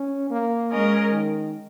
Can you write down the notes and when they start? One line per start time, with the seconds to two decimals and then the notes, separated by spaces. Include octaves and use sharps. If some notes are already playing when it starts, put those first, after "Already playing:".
Already playing: C#4
0.30 A#3
0.71 G#3 C#4 A#4 D#5
1.12 D#3